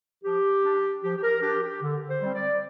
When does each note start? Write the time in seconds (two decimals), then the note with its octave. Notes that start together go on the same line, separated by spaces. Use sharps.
0.24 F3 G4
0.63 D4
1.02 F3 G4
1.17 G4
1.22 A#4
1.42 D4 G4
1.62 G4
1.82 D3
2.08 C5
2.21 G3 C4
2.34 D5